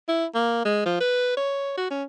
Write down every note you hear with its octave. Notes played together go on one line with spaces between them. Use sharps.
E4
A#3
G#3
F3
B4
C#5
F#4
C#4